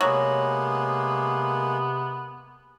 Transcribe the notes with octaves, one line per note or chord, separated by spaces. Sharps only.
C3 F#3 G#3 A#3 B3